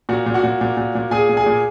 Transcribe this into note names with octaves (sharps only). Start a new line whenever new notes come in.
A#2 F#4 F#5
A#2
F#4 F#5
A#2
A#2
A#2
A#2
A#2 G#4 G#5
A#2
G#4 G#5
A#2